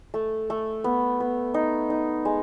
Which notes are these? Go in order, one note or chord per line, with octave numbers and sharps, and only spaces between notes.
A3
A3
B3
B3
D#4
D#4
G#3